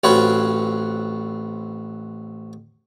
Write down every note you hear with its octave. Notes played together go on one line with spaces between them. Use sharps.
A1 C4 F4 F#4 B4 C#5